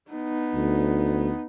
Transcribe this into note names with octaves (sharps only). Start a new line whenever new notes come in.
B3 D#4
D2